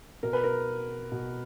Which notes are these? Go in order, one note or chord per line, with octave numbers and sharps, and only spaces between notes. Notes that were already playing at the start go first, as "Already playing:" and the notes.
B2 A#4
B4
A#4
B2